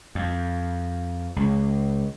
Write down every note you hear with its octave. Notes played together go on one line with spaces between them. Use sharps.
F2
C#2